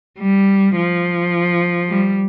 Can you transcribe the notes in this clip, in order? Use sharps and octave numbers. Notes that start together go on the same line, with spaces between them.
G3
F3
G3